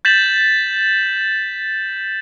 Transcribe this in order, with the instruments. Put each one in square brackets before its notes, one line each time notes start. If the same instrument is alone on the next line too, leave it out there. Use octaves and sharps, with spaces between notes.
[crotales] G6 A6 B6 E7 F#7